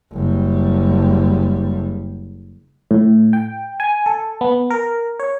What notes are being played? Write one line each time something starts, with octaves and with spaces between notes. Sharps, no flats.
F#1 G3
A2
G5
G#5
A4
B3
A#4
C#5